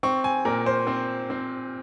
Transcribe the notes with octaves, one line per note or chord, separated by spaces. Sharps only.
C4 C#6
G#5
A#2 A#4
C5
C4
C4